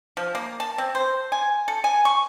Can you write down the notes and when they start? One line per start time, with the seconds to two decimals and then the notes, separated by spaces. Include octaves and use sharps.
0.17 F3
0.35 A#3
0.60 A5
0.78 C4
0.95 C5
1.32 G#5
1.68 A4
1.84 G#5
2.05 C#6